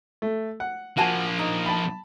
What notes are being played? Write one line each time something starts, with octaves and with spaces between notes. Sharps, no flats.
A3
F#5
F3 A#3 F#4 G#5 A5
D#4
A5 B5